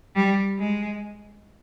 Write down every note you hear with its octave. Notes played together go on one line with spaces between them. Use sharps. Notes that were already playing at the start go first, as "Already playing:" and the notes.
G3
G#3